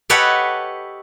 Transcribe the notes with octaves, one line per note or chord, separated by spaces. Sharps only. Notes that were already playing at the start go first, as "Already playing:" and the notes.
G4 A4 B4 C#5 D#5 F#5